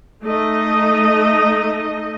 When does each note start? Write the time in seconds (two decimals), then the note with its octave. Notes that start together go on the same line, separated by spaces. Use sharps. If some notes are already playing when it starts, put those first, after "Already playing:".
0.23 A3 D#4 D#5